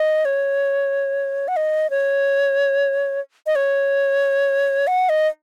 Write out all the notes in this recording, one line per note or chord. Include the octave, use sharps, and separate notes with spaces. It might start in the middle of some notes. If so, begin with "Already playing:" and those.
Already playing: D#5
C#5
F#5
D#5
C#5
D#5
C#5
F#5
D#5